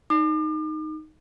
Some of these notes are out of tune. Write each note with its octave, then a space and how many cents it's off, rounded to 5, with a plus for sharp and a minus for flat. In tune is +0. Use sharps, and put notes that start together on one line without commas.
D#4 +0 D6 +40